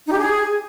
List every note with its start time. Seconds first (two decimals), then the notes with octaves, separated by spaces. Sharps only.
0.07 D#4
0.12 G4
0.18 G#4